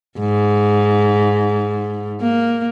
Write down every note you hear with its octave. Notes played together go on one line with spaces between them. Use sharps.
G#2
A#3